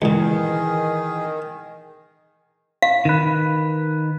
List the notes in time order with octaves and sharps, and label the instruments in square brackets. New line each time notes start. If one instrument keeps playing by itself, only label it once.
[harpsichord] C#2 A#2 [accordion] D#3 [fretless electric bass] E3 [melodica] G#4
[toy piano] F5
[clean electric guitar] D#3 B4